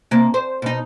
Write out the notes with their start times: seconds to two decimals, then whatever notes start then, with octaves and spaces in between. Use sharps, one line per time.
0.11 C3 A#3
0.34 C5
0.62 B2 D#4